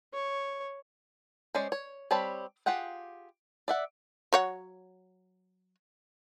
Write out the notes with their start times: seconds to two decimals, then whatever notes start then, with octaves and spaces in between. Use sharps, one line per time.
0.13 C#5
1.55 G#3 C#4 C5 D5
1.72 C#5
2.11 G3 C4 C#5 A5 B5
2.66 F4 G4 G#4 F#5 G5
3.68 D5 E5 F#5
4.33 F#3 C#5 F#5